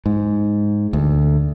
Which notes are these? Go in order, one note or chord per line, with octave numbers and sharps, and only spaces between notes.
G#2
D2